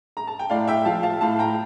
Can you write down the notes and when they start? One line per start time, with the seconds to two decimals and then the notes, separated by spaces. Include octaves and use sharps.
0.17 A#5
0.27 A5
0.39 G5
0.50 A2 D5 F5
0.67 E5 G5
0.85 F3 F5 A5
1.03 F5 A5
1.21 A2 F5 A5
1.39 G5 A#5